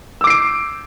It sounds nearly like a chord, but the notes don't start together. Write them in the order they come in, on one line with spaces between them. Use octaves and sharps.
E6 D6 C7 D7